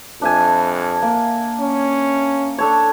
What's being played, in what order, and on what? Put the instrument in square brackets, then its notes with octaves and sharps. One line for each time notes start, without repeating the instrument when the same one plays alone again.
[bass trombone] F2 [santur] D4 E5 G#5
[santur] A#3
[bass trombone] C#4
[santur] D4 A4 C#5